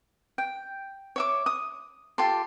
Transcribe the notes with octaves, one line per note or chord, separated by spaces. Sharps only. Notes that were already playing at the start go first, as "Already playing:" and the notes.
G5
C#5 E5 D6
D#6
F4 G4 A4 C6